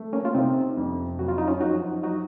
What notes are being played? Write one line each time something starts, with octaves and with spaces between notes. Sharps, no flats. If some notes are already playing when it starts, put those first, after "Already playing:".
Already playing: A3
A#3 C#4
F4
C3 C4 D#4
F2
F#2 F#4
F4
D#4
C#4 F4
F3 D#4 F#4
F#3 D#4 F#4